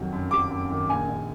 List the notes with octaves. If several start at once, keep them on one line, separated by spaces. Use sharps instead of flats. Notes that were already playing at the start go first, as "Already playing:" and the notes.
Already playing: F2 D#3 F#3
F#2
F#3 D6
F#2
D#3
A#1 G#5
A#1